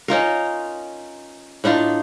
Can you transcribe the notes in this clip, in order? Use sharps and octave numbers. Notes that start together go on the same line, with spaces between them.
C#4 D#4 F4 A#4
A2 D4 D#4 F4